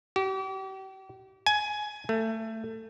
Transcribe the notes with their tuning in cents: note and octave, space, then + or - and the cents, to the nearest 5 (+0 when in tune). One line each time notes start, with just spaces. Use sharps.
G4 -40
G#5 +15
A3 +20